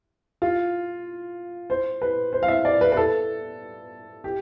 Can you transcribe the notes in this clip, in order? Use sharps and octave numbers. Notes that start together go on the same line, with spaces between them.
F4
C5
B4
C5
F5
E5
D5
B4
B4
A4
G4